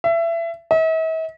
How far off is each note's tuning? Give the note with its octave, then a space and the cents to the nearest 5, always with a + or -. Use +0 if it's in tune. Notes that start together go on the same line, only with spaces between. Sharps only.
E5 +25
E5 -45